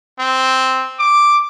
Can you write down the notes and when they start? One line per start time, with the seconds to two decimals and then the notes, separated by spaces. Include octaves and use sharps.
0.19 C4
0.99 D6